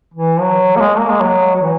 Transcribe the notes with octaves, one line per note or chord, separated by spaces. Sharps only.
E3
F#3
A#3
G#3
A#3
G#3
F#3
F#3
E3